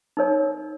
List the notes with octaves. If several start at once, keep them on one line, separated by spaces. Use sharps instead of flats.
D#4 A#4 C#5